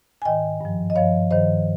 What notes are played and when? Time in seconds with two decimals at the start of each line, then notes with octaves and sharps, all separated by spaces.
0.22 G#5
0.25 G#2 D#3 D#5 G5
0.61 G2 F3
0.90 D#5
0.96 G2 F3 C#5 F5
1.31 G2 D#3 C5 D#5